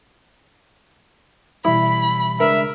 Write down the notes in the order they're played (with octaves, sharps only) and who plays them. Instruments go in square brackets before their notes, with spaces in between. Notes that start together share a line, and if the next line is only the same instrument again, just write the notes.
[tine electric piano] B2 E3 G3 [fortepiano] E4 [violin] B5
[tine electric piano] C#3 G#3 D4 [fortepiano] A#4 [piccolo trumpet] E5